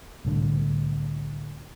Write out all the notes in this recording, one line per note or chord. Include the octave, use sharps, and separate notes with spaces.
C2 A2 D3